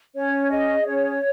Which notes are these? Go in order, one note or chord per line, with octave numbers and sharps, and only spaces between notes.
C#4 C#5
G#4 D#5
C#4 C#5